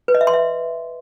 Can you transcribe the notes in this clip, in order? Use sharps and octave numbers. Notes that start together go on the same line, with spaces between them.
B4
D#5
E5
C6
E5